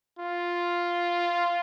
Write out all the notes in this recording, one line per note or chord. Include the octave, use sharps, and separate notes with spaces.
F4